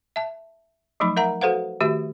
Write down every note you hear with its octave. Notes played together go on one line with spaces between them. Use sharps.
E5 A5
F3 F#3 A3 D#4 B5
A#4 E5 F#5 A#5
F#4 A4 B4 C5 F5 F#5
D#3 A3 F#4 G4 E5